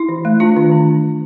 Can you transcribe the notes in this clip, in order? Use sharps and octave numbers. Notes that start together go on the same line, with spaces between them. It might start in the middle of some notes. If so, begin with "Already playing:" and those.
Already playing: E4
E3
A3
D4 F4
D#3
D4